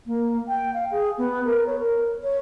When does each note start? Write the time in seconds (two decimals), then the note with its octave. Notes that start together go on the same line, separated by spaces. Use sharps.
0.06 A#3
0.48 G5
0.74 F5
0.91 G#4
1.18 B3
1.45 A#4
1.66 C#5
1.79 A#4
2.23 C#5